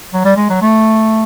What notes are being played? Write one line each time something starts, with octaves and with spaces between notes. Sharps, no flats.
F#3
G3
G#3
F#3
A3